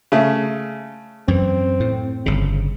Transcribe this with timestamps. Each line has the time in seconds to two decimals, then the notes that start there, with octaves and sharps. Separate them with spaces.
0.12 C#3 A3
1.28 F#2 E3 C4
1.80 A2
2.26 G1 C#3